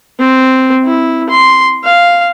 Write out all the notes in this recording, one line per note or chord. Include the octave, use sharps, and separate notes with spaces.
C4
E4
C6
F5